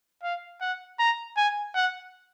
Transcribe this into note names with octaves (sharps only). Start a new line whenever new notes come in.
F5
F#5
A#5
G#5
F#5